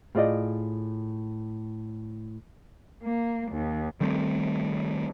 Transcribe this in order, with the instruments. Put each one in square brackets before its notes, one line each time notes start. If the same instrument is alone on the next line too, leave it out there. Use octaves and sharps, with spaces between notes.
[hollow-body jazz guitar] A2 F4 G#4 A4 D5 D#5
[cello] A#3
D#2
[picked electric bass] D#3 G3 A3 C4